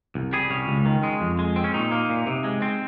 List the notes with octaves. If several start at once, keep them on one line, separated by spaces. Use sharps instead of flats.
C2
G3 G#4
C2 C#4
C#2
D#3
G#3
F2
G#3
C4
C#4
A#2 D#4
A#3
A#2
C3
G#3
C4